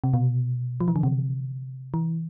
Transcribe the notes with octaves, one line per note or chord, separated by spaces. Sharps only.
C3
B2
F3
E3
D3
C3
E3